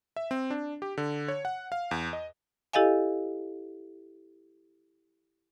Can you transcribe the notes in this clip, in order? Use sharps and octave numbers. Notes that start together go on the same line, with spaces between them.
E5
C4
D4
G4
D3
C#5
F#5
F5
E2
D#5
E4 G4 A4 D#5 F5 G#5